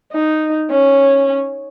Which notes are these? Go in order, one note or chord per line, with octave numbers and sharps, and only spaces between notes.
D#4
C#4